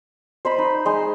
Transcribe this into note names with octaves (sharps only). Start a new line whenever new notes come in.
C5 D#5 B5
D#4
G#3 C6